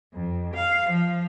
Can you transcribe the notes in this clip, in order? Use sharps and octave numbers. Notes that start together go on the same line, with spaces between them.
F2
F5
F3